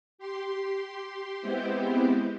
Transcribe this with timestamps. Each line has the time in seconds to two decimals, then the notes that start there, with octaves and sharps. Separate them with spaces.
0.18 G4 C6
1.40 G#3 B3 C4 E4 G4 C5